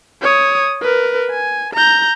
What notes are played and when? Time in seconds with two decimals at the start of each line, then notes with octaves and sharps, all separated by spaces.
0.22 C#5 D#6
0.82 A#4 B4
1.31 G#5
1.74 A#5 G6